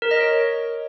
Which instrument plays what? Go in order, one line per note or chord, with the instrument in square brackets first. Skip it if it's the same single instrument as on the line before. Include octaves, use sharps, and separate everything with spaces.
[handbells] A#4
D#5
C#5